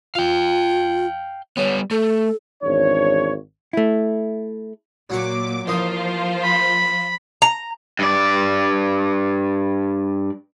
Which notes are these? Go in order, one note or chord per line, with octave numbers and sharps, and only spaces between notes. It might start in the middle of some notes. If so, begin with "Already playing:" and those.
F4 F5 G5
G3 B3 C#5
A3 A4
G#1 E2 D4 C#5
A3 E4
A#2 F#3 F#5 C#6 D6
A1 F3 A#3 F4 C5 D#6
B5
A#5
G2 D5